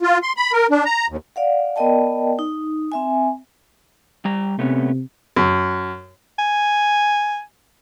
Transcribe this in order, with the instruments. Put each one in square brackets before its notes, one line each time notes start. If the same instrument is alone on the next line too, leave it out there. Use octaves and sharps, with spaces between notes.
[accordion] F4
C6
B5
A#4
D4
A#5
D#2
[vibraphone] D5 F5 F#5
B3 A#4 D5 D#5 G5 A5
D#4
C4 E5 G#5
[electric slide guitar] G3 A#5
[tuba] C3 [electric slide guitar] A3 B3 C#4
[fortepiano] F#2
[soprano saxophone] G#5